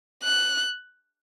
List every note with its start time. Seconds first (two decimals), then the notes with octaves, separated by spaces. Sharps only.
0.23 F#6